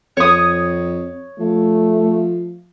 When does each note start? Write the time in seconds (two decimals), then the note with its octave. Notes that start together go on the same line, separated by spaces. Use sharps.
0.17 F2 C#5 D#6
1.39 F3 A3